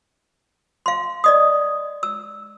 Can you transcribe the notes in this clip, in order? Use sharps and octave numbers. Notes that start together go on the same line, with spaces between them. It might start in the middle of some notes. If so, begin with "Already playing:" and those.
F5 C6
D5 D#5 D#6
E6